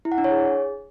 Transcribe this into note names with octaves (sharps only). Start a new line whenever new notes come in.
E4
F#5
D4
C#5
G#4